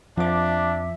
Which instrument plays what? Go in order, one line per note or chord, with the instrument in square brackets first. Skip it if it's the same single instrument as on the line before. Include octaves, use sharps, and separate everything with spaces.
[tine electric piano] F2 D6 [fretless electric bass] F3 [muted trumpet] D4 [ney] E5